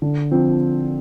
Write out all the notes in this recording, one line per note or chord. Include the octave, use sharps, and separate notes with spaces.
D3
F3 C4